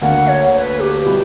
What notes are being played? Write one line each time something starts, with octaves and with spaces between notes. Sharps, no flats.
D2 D3 A#3 F#5
C#5
C#5
B4
G4
B2 G3 B3 E4